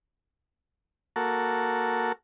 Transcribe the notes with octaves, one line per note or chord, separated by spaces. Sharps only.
A#3 F#4 A4